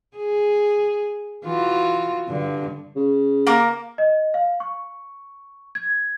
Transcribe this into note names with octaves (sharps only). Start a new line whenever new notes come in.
G#4
E3 F4 F#4
G2 D3
C#3
A#3 A#4 D6
D#5
F5
C#6
G#6